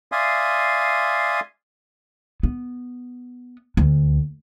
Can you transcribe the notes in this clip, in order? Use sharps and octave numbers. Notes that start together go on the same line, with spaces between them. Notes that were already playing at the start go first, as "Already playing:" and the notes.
D5 E5 F5 G#5 C6 D#6
B3
D2